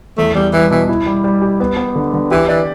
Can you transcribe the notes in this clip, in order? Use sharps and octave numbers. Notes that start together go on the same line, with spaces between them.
E2 A3
E2 G3
E3 G3
B2 E3
E4
G3
G3
G4
B3
B3
D3
D3
E3 G4
E3 D5